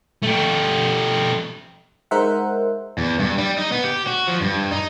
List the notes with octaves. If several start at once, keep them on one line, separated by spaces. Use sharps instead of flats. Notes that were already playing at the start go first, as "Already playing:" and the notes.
A3 G4
G#3 D#4 A#4 C5 E5 F#5
E2
G2
G3
D#4
B3
G4
F#4
F3
G2
D#4